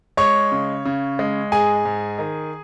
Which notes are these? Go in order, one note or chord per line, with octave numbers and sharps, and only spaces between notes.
G#3 C#5 C#6
C#3
C#3
G#3
G#2 G#4 G#5
G#2
D#3